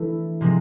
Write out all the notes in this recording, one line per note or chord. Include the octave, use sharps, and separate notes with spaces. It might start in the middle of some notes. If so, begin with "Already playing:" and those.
Already playing: E3 A3 D4
C3 F3 G#3